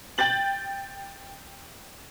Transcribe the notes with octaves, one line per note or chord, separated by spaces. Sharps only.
G5 G6 A6 F#7